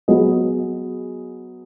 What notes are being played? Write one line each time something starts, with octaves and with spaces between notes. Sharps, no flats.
F#3 B3 G#4 D#5